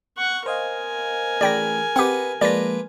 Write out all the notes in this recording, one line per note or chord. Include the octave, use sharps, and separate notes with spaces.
F#5 C#6
A#4 C5 D#5 F5 G#5
A1 G#4 D5 G5 B5 A#6
C4 G4 B4 D#5 F#5
F3 G#3 A#3 D4 F4 B4 D5 A#6